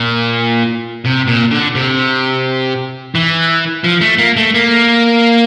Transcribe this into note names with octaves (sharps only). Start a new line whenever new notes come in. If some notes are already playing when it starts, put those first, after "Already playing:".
Already playing: A#2
C3
A#2
D3
C3
E3
F3
A3
A#3
A3
A#3